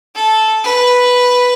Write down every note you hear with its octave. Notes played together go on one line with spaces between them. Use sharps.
A4
B4